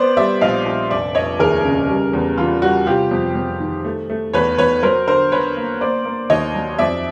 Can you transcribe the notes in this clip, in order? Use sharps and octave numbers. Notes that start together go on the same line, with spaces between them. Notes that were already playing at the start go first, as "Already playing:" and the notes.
Already playing: B3 C5 D5
G3 D5 E5
A#1 D#5 F5
A#1
F1 D5 E5
F1 C#5 D#5
D#2 G#4 A#4
C#3
G3
E2
E3 F4
G3 F#4
C3 F4 G4
F2
F2
D#3
A3
A3
E2 B4 C#5
E2 B4 C#5
F#3 A#4 C5
D3 A#4 C5
D3 B4 C#5
A#3
A#3 C5 D5
A#3
D#2 C#5 D#5
F#3
F2 D5 E5